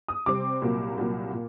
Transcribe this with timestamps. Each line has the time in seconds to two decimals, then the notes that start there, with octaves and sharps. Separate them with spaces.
0.08 D#6
0.26 C3 G3 C4 D6
0.62 C2 A#2 F#3 A#3
0.97 C2 A#2 F#3 A#3
1.33 A#2